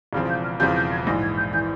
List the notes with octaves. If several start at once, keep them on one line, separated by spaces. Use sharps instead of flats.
E1 E2 C#3 F3 C4 F6
G6
F6
E1 E2 C#3 F3 C4 G6
G6
G#6
A#1 G#2 E3 A#6
G#6
G6
E3 G6